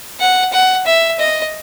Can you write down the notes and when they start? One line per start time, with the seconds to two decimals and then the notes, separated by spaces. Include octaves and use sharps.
0.20 F#5
0.52 F#5
0.86 E5
1.19 D#5